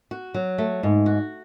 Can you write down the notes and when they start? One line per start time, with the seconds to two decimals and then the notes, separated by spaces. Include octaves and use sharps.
0.11 F#4
0.34 F#3
0.58 A3
0.83 G#2
1.06 F#4